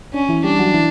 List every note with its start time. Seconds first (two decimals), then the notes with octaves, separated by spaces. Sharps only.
0.14 C#4 D4
0.29 E3 E4
0.44 G3 D4 G4
0.59 F#3 F#4
0.74 E3 E4